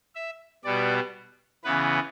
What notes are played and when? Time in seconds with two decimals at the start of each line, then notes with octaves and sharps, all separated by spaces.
0.15 E5
0.64 B2 G3 B3 D5
1.64 C#3 E3 B3 B4